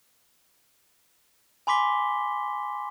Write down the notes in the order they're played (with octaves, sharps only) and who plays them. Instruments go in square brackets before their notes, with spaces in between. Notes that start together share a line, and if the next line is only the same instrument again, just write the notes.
[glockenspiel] G#5 B5 C6 D6 B6 G7